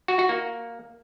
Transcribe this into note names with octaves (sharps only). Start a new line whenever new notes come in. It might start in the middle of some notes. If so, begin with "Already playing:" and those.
F#4
F#4
A#3